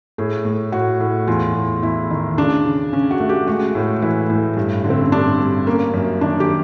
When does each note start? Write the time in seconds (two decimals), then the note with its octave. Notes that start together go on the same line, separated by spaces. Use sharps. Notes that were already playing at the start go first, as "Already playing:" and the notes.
0.18 A2 G#4
0.45 A2
0.72 A2 F#4
1.00 A2
1.27 E2 F4
1.55 E2
1.82 E2 E4
2.11 D#3
2.37 C#3 D4
2.66 C#3
2.93 C#3 C#4
3.11 F#4
3.20 A3
3.29 G4
3.47 G#3 F#4
3.75 A2
4.02 E3 E4
4.30 A2
4.57 G2
4.84 D3
4.90 C4
5.01 C#4
5.12 G2 D4
5.40 G2
5.67 A#3 C#4
5.94 F#2
6.21 D#3 D4
6.40 G4